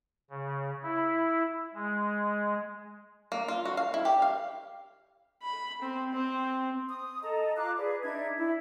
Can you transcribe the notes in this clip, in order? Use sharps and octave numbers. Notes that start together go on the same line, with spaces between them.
C#3
E4
G#3
A#3
F4
F#4
F5
E4
G4
F5
B5
C4
C4
D#6
A4 D#5 A5 A#5
F4 F5 D6 F#6
G#4 B4 D5
D4 D#4 E5 G#6
E4